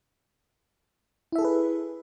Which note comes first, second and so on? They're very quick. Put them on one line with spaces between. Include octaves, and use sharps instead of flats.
E4 E5 A4 G#4 B4